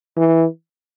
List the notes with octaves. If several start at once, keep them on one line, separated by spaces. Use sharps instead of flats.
E3